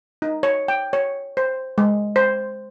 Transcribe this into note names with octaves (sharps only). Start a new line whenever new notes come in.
D#4
C#5
G5
C#5
C5
G#3
C5